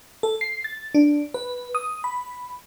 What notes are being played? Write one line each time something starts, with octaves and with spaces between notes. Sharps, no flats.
A4
C7
A6
D4
B4
D#6
B5